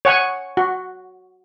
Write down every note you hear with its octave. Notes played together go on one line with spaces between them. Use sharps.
C#5 F#5 G#5 C#6
F#4